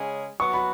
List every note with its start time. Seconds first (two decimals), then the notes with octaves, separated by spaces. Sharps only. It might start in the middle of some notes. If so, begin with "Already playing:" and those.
Already playing: C#3 G#3 C#4 G#4
0.39 F#3 B3 F#4 C#6
0.54 B5